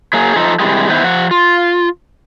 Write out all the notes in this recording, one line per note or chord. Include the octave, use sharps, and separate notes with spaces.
F#3 A#3 G#4
F3 D#4 A4
C3 E3 G3 G#3
D#3 B3 E4 B4 C5
F3 F#5
F4